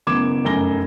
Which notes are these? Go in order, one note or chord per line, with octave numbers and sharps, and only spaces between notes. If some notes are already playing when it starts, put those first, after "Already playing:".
F#1 F#2 B3 D6 G#6 E7
F1 F#2 G#5 A#6 G7